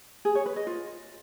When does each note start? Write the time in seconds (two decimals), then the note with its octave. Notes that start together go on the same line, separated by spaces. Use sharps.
0.25 G#4
0.35 C#5
0.46 B4
0.56 D#5
0.67 F4